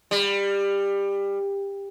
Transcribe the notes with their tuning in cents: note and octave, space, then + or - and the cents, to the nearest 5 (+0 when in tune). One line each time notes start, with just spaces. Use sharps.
G3 +20